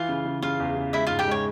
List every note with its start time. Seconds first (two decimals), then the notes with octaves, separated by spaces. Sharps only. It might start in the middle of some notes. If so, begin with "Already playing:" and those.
Already playing: E3 F4 F5
0.09 C#3
0.26 C#3
0.42 C#3 F4 F5
0.60 E2
0.77 C#3
0.93 G#3 E4 E5
1.07 G#2 F4 F5
1.19 G4 G5
1.28 G#3 C#5